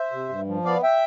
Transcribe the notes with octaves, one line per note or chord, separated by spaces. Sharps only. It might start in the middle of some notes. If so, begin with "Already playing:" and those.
Already playing: C5 E5
C3
G2
F3
B3 D5 F5
E5 G5